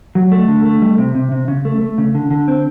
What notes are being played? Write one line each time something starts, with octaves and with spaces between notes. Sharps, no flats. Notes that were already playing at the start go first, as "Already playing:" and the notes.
F#3
A3
D3
A3
G3
C3
C3
C3
C#3
A3
A3
C#3
D3
D3
C4